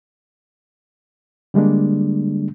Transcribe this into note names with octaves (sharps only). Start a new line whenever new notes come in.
D3 G3 G#3 A#3 D4